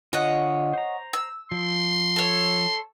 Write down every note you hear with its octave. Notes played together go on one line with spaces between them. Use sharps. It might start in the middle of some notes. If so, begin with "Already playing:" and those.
D3 F4 C#5 D#5 F#5
C5 A#5
E6
F3 C6
A4 C#5